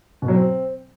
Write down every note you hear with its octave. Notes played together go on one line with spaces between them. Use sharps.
B2
F#3
C4